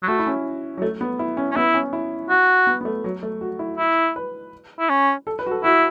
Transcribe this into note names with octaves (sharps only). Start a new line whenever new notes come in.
F#3
A3 F#4
E4
C#4
F#3
A3
B3
E4
C#4
C#4
B3 E4
C#4
E4
F#4
B3
B3
A3
F#3
A3
F#4
E4
E4
B4
E4
C#4
A4
B4
F#4
A4
E4 F#4